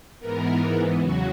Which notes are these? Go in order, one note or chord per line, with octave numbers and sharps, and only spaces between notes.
G#2 E3 B3 A#4
E2 C#3 F#3 F#4